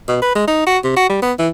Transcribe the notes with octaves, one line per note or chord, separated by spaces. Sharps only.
B2
B4
G#3
D#4
F#4
C3
F#4
G3
B3
E3